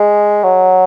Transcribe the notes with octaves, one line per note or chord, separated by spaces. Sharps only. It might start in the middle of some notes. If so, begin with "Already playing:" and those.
Already playing: G#3
F#3